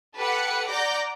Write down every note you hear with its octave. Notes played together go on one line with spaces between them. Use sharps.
G4 A4 B4 F#5 F#6 C#7
D5 F#5 A#5 D6 G6 A#6